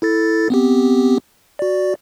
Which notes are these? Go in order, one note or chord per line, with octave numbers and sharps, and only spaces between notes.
E4 A4 A6
B3 C4 G4
F#4 D5